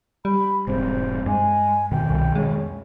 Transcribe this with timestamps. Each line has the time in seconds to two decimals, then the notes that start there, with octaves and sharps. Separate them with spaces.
0.25 G3 B5
0.67 E1 G#2 C4 C5
1.26 G2 G#3 G#5
1.91 F2 B2 D#3 G5
2.10 C2
2.35 G#3 C#4